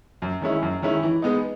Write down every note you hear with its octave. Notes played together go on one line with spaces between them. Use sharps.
F#2
D#3 G#3 C#4 E4
F#2
D#3 G#3 C#4 E4
E3
G#3 B3 D#4